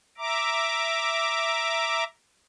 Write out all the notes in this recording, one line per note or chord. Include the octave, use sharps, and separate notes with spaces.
E5 A#5 D6